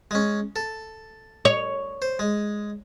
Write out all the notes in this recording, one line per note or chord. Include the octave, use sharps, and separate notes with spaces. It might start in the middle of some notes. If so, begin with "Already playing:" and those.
G#3 C#4
A4
C#5
C5
G#3